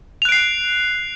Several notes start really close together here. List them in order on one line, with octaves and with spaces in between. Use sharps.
F7 F#6 D7 C7